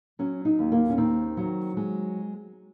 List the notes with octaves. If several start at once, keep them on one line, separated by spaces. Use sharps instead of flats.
F#3 C#4
D#4
D#2
A#3
C#4
D#3 C4
F#3
G#3